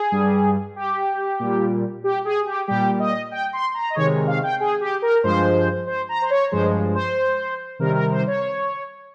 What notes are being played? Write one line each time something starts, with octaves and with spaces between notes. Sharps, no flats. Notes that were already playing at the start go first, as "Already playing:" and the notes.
Already playing: G#4
G2 G3
G4
A#2 G3
G4
G#4
G4
A#2 G3 G4
D#5
G5
C6
A#5
D#5
C3 D#3 G#3 C#5
F5
G5
G#4
G4
A#4
G2 F3 G#3 C5
C5
A#5
C5
C#5
G2 F3 G#3 C5
C5
C3 D#3 G3 A#4
A#4
C5
C#5